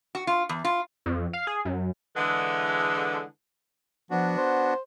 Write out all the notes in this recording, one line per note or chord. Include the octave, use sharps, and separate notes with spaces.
F#4
F4
E2
F4
F2
F5
G#4
F#2
D3 E3 G#3
F3 B3 D4 F#4
C5